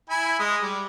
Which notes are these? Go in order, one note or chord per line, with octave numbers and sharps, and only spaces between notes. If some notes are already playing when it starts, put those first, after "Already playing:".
E4 G#5 B5
G#3 D#6
G3